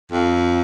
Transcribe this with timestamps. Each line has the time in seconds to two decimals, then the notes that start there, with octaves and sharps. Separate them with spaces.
0.11 F2